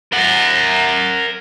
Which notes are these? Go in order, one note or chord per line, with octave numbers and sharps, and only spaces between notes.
A#4 F#5